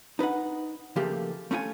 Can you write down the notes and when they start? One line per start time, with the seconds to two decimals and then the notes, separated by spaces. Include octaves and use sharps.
0.19 D#4 B4 D#5 F#5
0.96 C#3 F3 A3 A#3 G4
1.51 A3 C#4 E4 F4 G#5